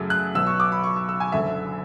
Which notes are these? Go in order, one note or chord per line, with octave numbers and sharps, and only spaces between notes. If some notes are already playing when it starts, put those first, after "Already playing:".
Already playing: F#2 C#3 F#3 A3
F#6
B1 B2 F#3 E6
C#6
D6
B5
C#6
E6
E6
G#5
F#1 F#2 D3 E5